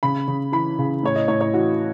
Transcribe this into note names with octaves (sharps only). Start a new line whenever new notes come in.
C#3 B5
C#3
E3 B5
C#3
A2 C#5
D#5
A2 C#5
C#5
E3 F#4